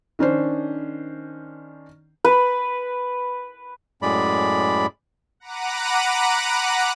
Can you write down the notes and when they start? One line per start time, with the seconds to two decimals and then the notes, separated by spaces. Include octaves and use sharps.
0.19 D#3 C#4 D4 C5
2.25 B4
4.02 F#2 A2 G#3 D5 B5
5.40 F#5 A#5 B5 D6 F#6 D#7